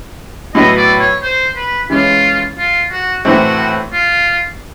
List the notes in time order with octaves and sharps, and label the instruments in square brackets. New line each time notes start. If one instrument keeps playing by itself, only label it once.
[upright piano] A2 F#3 B3 E4 [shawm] D#5
[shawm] D5
C#5
C5
B4
[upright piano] E3 G#3 C#4 [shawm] F4
[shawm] F4
F#4
[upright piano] A2 E3 A3 C4 [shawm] F#4
[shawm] F4